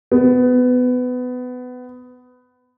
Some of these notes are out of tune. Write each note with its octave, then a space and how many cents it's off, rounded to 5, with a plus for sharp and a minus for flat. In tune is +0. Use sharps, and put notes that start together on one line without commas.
B3 +20